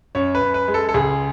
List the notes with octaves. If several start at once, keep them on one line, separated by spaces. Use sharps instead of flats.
F#2 C#5
B4
F#2
B4
G#3
A4
A4
C#2 G#4